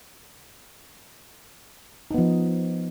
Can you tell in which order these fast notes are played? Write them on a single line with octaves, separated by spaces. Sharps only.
D#4 B3 F3